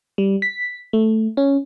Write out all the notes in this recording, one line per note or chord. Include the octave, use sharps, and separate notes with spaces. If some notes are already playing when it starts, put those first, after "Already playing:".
G3
B6
A3
C#4